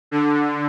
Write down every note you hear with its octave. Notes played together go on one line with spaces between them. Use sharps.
D3